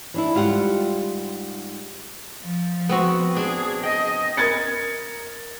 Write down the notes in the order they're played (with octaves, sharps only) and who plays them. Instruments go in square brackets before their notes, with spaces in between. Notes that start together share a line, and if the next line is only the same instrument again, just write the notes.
[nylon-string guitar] E3 D4 E4
G#2 G3 F4 G4 G#4 F#5
[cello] F3
[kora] B3 C4 F#4
[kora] D4 [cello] G#4
[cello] D#5 [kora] G5
[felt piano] A#4 G#6 A6 C#7